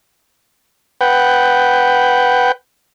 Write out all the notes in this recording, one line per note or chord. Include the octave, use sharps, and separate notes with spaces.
B4 F#5 G5